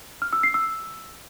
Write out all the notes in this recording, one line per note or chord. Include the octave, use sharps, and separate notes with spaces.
F6
E6
C7
E6